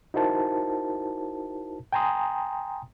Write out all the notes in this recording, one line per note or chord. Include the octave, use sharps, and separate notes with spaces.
D#4 E4 F#4 A#4 C5 A5
G5 G#5 A#5 C6 D#6